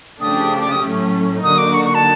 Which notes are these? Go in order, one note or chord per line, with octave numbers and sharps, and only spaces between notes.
C#3 F3 A3 D4 G4 D#6
D6
D#6
A2 F#3 A3 C#4
D3 F#3 A#3 D#4 F#4 D#6
D6
C#6
C#6
A5